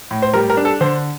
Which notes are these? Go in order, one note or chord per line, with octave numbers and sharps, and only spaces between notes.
A2
C5
G3 A#4
A#4
D4
A4
D3 C5